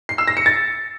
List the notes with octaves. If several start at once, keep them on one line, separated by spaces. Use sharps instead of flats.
C7
E6
A#6
C#7
A6